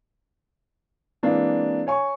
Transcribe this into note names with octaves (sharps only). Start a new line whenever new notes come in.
E3 G#3 A#3 C4 D4
C#5 G#5 C#6